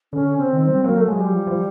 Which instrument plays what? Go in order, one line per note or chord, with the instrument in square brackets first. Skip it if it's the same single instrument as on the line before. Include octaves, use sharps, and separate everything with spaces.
[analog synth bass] D3 [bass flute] C#4
[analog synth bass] C#3 [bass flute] C4
[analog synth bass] D#3
[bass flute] C4
[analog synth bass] G3
[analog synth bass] F#3 [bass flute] A#3
[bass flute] A3
[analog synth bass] F#3 [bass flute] G#3
[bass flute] G3
[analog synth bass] F3
F3